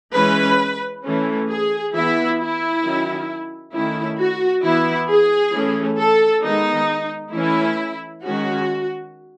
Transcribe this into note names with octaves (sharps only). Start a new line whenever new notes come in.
E3 G#3 C#4 B4
E3 A3 C#4
G#4
E3 B3 E4
E4
D#3 F#3 C#4
D#3 A3 C#4 E4
F#4
E3 B3 E4
G#4
E3 A3 C#4
A4
D#3 G#3 B3 D#4
E3 A3 C#4 E4
D#3 G#3 C#4 F#4